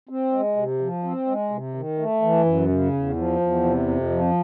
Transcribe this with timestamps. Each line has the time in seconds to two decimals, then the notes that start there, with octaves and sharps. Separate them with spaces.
0.09 C4
0.32 G#3
0.56 C3
0.81 F3
1.04 C4
1.27 G#3
1.51 C3
1.74 D#3
1.98 A3
2.22 E3
2.45 F#2
2.69 C#3
2.93 E2
3.16 F3
3.40 E2
3.64 C3
3.88 F2
4.10 F3